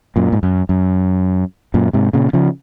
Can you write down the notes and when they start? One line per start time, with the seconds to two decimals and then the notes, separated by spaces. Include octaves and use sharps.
0.16 F#2 A#2
0.32 G#2
0.43 F#2
0.69 F#2
1.74 F#2 A#2
1.93 G#2 C3
2.13 A#2 C#3
2.33 C#3 F3